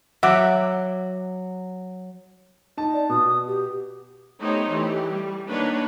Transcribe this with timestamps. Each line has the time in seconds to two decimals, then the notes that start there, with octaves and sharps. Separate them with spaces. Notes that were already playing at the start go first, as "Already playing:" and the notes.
0.23 F#3 E5 F#5 D6
2.77 D#4 A5
2.93 D5
3.09 B2 D#6
3.47 G4
4.38 A3 B3 D#4 G4 C5 C#5
4.70 E3 A3 G4
5.09 G3
5.47 D#3 A#3 D4 B4 C#5